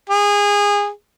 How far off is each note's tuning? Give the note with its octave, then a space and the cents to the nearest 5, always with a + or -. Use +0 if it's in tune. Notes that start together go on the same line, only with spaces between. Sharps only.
G#4 -25